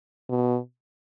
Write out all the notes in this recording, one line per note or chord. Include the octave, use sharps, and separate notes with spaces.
B2